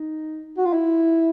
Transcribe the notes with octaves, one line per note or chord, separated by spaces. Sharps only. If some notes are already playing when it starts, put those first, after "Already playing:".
Already playing: D#4
F#4
F4
E4